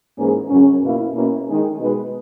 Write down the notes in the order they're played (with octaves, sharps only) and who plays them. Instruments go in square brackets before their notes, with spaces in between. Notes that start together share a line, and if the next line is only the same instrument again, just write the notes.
[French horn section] G#2 E3 A#3 C#4 G#4
F#2 C#3 F#3 C#4
B2 A#3 E4
B2 A#3 C#4 E4
D#3 G#3 D#4 G#4
B2 G#3 D#4 G#4 B4